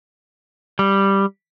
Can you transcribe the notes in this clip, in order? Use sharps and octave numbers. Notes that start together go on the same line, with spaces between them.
G3